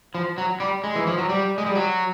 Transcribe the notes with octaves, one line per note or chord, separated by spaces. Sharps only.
F3
F#3
G3
G#3
E3
F3
F#3
G3
G#3
G3
F#3